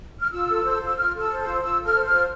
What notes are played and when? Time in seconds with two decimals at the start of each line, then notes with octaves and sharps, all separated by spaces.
0.20 F6
0.32 F4 E6
0.48 A4
0.64 C5
0.81 F4
0.86 E6
0.97 F4 F6
1.14 A4
1.19 E6
1.30 C5
1.41 F4 E6
1.62 F4 E6
1.79 A4
1.85 F6
1.95 C5
2.06 F6
2.12 F4